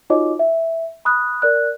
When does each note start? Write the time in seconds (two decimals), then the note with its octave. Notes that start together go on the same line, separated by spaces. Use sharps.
0.10 D#4 F4 F#4 C#5 D#5 D6
0.39 E5
1.05 B5 D#6 F#6
1.42 A#4 D5 F#6